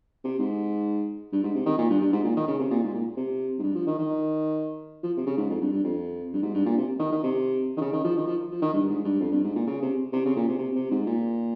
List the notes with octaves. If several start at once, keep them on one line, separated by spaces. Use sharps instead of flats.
C3
G#2
G2
G#2
C3
D#3
A#2
G2
G2
G#2
A#2
D#3
C#3
C3
A#2
G#2
A#2
C3
G#2
G2
F3
D#3
D#3
F3
C3
C#3
G#2
F2
G2
G2
F2
G2
G#2
G2
A#2
C3
D#3
D#3
C3
D#3
C#3
D#3
F3
D#3
F3
F3
D#3
G2
G#2
G2
F2
G2
G#2
A#2
C#3
C3
C3
C#3
A#2
C3
C3
C3
G#2
A#2